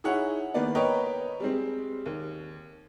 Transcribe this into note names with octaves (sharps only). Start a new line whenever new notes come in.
D#4 E4 G#4 C#5 F#5
D#3 A#3 B3 B4 D5
A#4 B4 C#5 D#5 G5
G3 G#3 C4
D#2